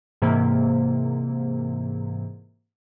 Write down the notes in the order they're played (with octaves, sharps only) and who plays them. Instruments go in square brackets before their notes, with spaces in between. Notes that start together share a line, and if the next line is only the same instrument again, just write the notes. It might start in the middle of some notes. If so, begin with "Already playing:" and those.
[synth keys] G#2 C3 E3 A#3